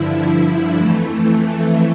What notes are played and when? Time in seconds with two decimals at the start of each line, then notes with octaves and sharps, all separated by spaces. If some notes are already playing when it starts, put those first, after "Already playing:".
Already playing: G2 D3 F3 E4
0.78 F2 E3 A3
1.46 A3